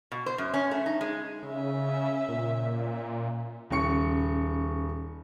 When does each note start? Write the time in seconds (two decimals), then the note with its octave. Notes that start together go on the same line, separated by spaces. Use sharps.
0.12 B2
0.26 C5
0.38 F#2
0.54 C#4
0.71 A3
0.86 D#4
1.01 G#3
1.43 C#3 C#4 E5
2.29 A#2
3.70 D#1 C#3 C#6 C#7